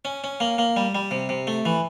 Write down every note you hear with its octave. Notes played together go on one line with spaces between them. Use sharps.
C#4
C#4
A#3
A#3
G3
G3
C3
C3
A3
E3